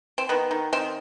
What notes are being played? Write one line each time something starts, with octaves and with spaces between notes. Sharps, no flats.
C4
D#3 B3
D#3
D#3 C4